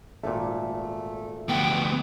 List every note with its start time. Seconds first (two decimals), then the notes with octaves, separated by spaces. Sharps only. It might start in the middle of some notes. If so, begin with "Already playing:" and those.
0.24 G#1 A#2 A3
1.48 D2 B3 G5